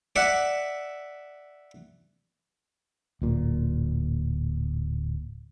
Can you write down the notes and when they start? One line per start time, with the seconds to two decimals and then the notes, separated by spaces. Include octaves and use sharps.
0.16 D5 E5 F#5
3.22 D1 A#2